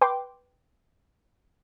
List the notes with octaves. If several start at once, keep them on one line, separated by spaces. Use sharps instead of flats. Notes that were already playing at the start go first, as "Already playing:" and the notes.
B4 G5 C6 D6